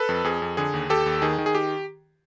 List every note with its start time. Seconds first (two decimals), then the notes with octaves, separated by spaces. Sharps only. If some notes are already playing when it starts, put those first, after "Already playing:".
Already playing: A4 B4
0.09 F2
0.24 F2 G#4
0.42 F2
0.57 D3 G#4
0.74 D#2
0.89 D#2 G4 A4
1.06 D#2
1.22 D#3 G#4
1.38 D#3
1.46 G#4
1.55 G4